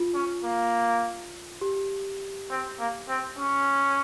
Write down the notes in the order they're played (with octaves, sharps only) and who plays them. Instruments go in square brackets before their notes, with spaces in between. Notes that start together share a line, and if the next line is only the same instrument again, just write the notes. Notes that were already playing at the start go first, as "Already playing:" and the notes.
Already playing: [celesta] F4
[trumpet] C#4
A#3
[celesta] G4
[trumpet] C4
A#3
C4
C#4